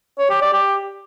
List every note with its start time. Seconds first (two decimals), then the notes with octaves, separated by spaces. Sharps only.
0.19 C#5
0.30 G4
0.42 D5
0.53 G4